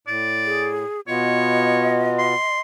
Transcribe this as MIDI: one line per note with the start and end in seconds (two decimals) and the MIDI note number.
0.07 0.85 45
0.07 0.68 74
0.46 1.01 68
1.08 2.34 47
1.08 2.34 59
1.08 2.34 65
1.08 2.07 73
1.08 2.59 75
2.19 2.61 84